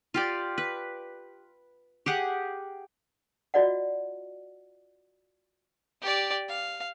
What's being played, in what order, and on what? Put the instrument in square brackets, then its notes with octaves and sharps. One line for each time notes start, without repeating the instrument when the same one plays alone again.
[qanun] F4 G4 D5
B4
G4 G#4 F#5
[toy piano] F4 F#4 D5 D#5 F#5
[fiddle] G4 D5
F5